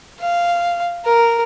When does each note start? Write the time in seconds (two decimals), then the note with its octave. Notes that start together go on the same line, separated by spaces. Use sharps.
0.20 F5
1.05 A#4